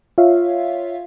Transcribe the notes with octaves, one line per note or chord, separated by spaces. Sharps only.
F4 C#5 E5 F5